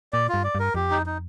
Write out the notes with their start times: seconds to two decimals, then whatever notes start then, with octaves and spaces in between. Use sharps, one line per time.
0.13 A#2 D5
0.29 F4
0.34 G2
0.44 D5
0.55 G2 A#4
0.75 F2 G4
0.91 D#4
1.06 D#4